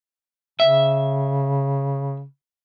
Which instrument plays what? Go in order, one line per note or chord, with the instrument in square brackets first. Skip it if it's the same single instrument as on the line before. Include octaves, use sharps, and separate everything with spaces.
[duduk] C#3 [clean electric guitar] E5